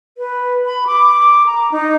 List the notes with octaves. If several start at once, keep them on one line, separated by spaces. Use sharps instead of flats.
B4
B5
D6
A#5
D#4